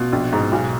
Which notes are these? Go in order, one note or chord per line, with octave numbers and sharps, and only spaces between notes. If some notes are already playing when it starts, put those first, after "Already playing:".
Already playing: B2 F4
A#1
G#2
B1